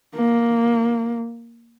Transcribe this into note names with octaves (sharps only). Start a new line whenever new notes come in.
A#3